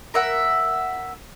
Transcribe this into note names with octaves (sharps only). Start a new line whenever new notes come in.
A#4 E5 F#5